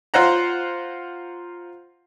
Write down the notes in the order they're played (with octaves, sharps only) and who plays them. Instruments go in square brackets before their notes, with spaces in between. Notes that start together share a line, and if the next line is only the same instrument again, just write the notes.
[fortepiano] F4 C5 F#5 A#5